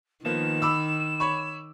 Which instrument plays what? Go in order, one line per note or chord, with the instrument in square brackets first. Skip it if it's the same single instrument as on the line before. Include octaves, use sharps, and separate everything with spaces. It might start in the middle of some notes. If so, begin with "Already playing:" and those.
[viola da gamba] D#3 [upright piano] F3 A#3 B3 [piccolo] E7
[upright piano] B5 D6 E6
C#5 B5 C#6